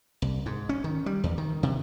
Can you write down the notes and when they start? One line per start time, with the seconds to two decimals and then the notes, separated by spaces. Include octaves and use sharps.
0.22 C2
0.46 G#2
0.69 C#4
0.84 D#3
1.06 G3
1.24 E2
1.38 D#3
1.63 C3